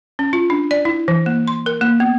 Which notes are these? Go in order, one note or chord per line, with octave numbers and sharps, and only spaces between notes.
C#4
F4
D4
D5
E4
E3
A#3
C6
A#4
A#3
B3